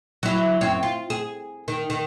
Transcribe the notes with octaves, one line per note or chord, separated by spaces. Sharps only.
F#3 E4
F#2 C4 C#5
F4
G#4
D#3
D#3